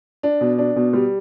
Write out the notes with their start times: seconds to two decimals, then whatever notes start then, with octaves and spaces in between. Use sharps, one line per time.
0.23 D4
0.41 B2
0.58 D4
0.76 B2
0.93 G3